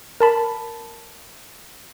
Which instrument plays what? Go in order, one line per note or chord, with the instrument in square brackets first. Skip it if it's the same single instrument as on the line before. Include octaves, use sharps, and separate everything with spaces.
[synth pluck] A#4 A5 B5